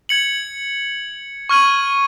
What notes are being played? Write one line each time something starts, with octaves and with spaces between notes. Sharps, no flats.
G#6 C#7 F#7
C#6 F6 G#6 D#7 F#7